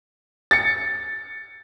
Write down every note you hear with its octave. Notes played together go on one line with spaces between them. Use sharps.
A6 C#7